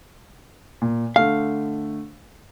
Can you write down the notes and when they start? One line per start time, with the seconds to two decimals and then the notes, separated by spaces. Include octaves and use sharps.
0.82 A#2
1.16 D3 A3 F5